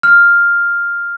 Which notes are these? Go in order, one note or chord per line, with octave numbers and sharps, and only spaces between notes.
F6